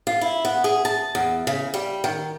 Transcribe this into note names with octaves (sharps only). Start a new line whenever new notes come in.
F4
E4
B3
G#4
A5
E2
C#3
G3
D#3